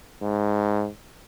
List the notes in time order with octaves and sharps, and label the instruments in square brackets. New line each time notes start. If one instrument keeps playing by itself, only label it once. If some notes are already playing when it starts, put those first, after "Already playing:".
[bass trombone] G#2